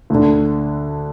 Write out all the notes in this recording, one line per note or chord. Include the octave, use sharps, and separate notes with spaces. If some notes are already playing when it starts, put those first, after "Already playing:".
D2 D3